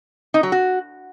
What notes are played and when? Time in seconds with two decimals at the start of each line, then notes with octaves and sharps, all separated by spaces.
0.34 D#4
0.43 F#3
0.52 F#4